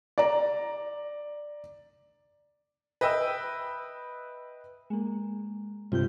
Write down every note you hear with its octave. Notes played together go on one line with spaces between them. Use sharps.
D5 A#5
B4 D#5 E5 G5 E6
G#3 A#3
G2 C3 G3 F4 G5 G6